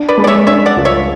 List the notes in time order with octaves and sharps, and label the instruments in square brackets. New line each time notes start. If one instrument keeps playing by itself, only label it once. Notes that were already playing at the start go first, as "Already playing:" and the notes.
Already playing: [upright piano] D4
[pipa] B4 D5
[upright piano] G#3
[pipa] D5
C#5 E5
[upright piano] D4 [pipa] C#5 E5
[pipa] D5 F#5
[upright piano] C#2
[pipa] C#5 E5